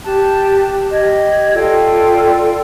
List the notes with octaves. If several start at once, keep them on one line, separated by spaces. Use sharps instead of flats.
G4 A5 F#6
G4 D#5 G#6
F4 A4 D5 G5